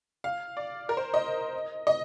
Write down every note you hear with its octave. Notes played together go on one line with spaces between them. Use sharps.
F5
D5
A#4
C5
D#5
D#5